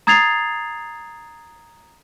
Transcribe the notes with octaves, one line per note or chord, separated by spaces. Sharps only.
A#5 D#6 G#6 A6 C7 F7